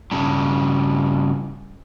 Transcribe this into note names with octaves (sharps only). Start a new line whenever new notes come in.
G2 C#3